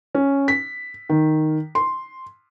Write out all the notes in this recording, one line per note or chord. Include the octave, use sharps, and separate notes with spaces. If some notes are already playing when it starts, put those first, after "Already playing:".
C#4
B6
D#3
C6